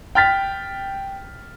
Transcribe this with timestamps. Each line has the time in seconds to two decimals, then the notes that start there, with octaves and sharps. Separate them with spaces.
0.15 G5 F6 A6 B6